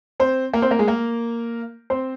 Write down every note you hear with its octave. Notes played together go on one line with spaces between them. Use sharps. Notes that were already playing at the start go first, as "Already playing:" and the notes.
C4 C5
A#3 A#4
C4 C5
A#3 A#4
G#3 G#4
A#3 A#4
C4 C5